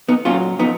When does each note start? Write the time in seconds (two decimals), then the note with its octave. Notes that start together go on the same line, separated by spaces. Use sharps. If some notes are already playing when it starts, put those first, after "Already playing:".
0.09 B3 D#4
0.25 A#2 F#3 C#4 F4
0.59 F3 B3 D#4